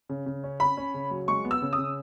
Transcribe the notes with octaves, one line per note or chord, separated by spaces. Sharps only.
C#3
C#3
C#4
C#4 B5
C#4
C#3
F#3
G#3 C#6
B3
E6
C#3
D#6
C#3